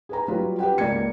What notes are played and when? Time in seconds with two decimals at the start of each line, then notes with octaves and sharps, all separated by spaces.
0.09 G#4 B4 A#5
0.28 F#3 G3 F4 B4
0.58 G4 B4 F#5 G5
0.78 C#2 A#3 D5 G#6 C#7